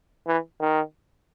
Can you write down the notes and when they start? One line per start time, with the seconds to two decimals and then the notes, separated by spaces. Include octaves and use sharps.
0.27 E3
0.60 D#3